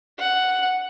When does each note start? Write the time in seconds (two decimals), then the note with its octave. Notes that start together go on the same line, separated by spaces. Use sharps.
0.19 F#5